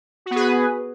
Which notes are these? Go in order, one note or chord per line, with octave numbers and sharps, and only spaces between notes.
B3 F#4 G#4 B4